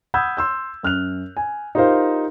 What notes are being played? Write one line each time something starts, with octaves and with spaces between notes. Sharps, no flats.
F#5 B5 D#6 E6 G6 G#6
C6 E6 G6
F#2 F6 F#6 F7
G#5
D#4 F4 G4 A#4 C5 F5